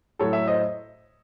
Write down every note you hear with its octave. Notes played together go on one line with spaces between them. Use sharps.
A2 F#3 A4 C#5
C#5 E5
C5 D#5